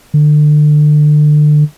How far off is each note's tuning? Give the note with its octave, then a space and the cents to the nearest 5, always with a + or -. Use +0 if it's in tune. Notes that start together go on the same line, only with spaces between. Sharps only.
D3 +30